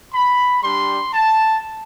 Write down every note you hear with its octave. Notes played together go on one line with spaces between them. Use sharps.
B5
G3 D4 G4 C6
A5